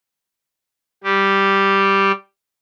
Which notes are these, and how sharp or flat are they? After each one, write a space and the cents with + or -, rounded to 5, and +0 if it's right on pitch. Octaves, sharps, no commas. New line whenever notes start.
G3 +0 G4 +0